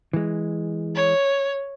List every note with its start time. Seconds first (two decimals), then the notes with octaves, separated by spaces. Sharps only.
0.13 E3 G#3
0.96 C#5